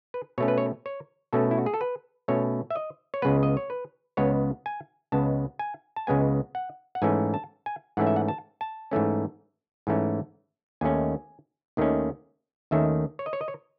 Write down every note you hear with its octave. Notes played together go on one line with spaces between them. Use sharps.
B4
B2 A3 C#4 C#5
B4
C#5
C#5
B2 A3 C#4 A4
E4
F#4
G#4
A4
B4
B2 A3 C#4 C#5
E5
D#5
C#5
C#2 C#3 G#3 B3 B4
D#5
C#5
B4
C#2 C#3 G#3 B3 C#5
G#5
C#2 C#3 G#3 B3 A5
G#5
A5
C#2 C#3 G#3 B3 G#5
F#5
F#5
G#2 E3 A3 C#4 G#5
A5
G#5
G#2 E3 A3 C#4 F#5
E5
F#5
A5
A5
G#2 E3 A3 C#4
G#2 E3 A3 C#4
D#2 D#3 A3 C#4 G#5
D#2 D#3 A3 C#4
D#2 D#3 A3 C#4 E5
C#5
D#5
C#5
D#5
C#5